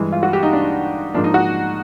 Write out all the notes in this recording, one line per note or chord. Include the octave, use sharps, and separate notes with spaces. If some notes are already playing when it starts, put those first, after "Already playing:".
Already playing: G2 E3 G#3
F4
F#4
G4
D#4
D4
G#2 F3 A#3 D4
D#4
F#4